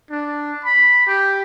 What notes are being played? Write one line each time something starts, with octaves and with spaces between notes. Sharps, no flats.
D4
B5
G4